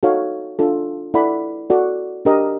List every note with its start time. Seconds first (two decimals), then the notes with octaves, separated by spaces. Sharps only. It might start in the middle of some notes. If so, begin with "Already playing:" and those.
0.03 D#4 F#4 A4 C#5 F5
0.59 D4 F4 A4
1.14 E4 A4 D5 F#5 B5
1.70 F#4 A4 D5
2.25 D4 G4 A#4 D#5